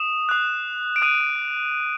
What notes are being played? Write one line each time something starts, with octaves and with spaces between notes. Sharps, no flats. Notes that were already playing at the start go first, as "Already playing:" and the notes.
Already playing: D#6 E7
D#6 F#6
D7
D#6 F#6 D#7